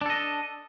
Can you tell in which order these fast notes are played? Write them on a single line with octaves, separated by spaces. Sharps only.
D4 A4 D#5